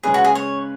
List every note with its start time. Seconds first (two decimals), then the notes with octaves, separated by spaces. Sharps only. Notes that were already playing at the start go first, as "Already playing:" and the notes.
0.03 C#3 G#3 C#4 G#4 B4
0.14 F#4
0.24 G#4
0.35 C#5